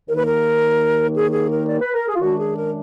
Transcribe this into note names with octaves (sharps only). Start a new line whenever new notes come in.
D#2 D#3 A#3 D#4 A#4
B4
A#4
G#4
G#4
A#4
D5
B4
A#4
G#4
F4
F#2 D#3 G#3 D4 F#4
G#4
A#4